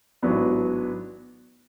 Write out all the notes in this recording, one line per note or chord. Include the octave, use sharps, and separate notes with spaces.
A1 G#2 F#3 B3 D4